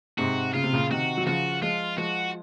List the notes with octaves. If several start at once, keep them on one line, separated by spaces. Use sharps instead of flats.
G#2 C3 F#4
C#3 F4
C3
A#2 C#3
C3 D#3 F#4
F#3
C#3 F3 F#4
F3 G#3 F4
F3 G#3 F#4